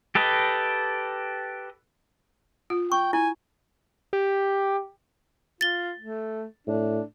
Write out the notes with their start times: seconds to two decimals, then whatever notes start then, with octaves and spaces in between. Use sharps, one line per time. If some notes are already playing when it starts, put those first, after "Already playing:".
0.15 G4 A4 B4 D#5
2.70 F4
2.92 G5 C#6
3.13 E4 G#5
4.13 G4
5.61 F4 A6 G7
5.99 A3
6.67 A2 D4